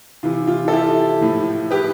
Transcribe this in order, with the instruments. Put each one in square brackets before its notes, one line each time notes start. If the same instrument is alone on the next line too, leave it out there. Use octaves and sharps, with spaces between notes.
[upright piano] C3 E3 F4
F4
A4
E4 G4
A2 F3
G4 B4